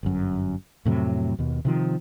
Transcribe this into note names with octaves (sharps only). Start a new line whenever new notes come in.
G1 F#2
F2 A2 C3 F#3
D#2 B2
C3 D#3 F3